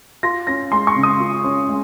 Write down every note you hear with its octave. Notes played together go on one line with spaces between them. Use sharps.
F4 A#6
C#4 A#6
G#3 C6
C#6
C#3
D#6
F4
C#4
G#3